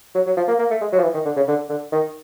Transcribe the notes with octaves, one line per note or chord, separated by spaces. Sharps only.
F#3
F#3
F3
A#3
A#3
A3
G#3
F#3
F3
E3
D#3
D3
C#3
D3
D3
D#3